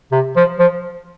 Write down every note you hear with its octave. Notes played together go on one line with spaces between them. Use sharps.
C3
F3
F3